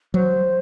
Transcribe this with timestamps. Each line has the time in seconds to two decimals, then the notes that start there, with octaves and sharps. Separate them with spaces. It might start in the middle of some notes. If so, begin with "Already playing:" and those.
0.14 F#3 C5